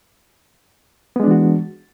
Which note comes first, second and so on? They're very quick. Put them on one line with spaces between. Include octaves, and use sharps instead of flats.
B3 G#3 D4 E3 F#4